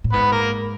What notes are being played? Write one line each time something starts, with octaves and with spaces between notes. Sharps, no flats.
A2
G#2 B3 B4
A#3 A#4